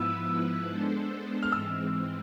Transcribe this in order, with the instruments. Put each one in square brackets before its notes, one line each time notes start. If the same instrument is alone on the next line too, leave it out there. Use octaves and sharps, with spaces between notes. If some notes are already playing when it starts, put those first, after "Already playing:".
Already playing: [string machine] G#2 F3 B3 E4 B4 [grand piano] E6
[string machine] G#3 B3 D4 A4 C5
[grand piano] F6
[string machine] G#2 E3 G#3 C4 [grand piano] E6